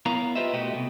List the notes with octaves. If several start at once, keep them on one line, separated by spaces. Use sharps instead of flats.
B3 E4 A#4 C#5 F5 A#5
F4 G4 B4 C5 D#5 E5
B2 A3 F#4 G4 D#5
C2 B2